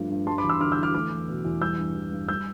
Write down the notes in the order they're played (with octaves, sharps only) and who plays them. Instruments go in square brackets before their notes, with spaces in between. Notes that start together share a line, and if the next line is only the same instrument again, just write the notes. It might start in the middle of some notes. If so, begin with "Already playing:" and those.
Already playing: [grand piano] G2 F3 A3
G2
G3 A5 C6
B5 D6
E2
C6 E6
D3 D6 F6
E6 G6
E2
D6 F6
A3 D6 F6
E2
B2
E2
G3 E6 G6
G2
E3
G2
G3 E6 G6